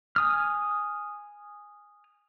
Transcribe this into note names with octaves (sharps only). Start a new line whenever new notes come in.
G#5 D#6 F6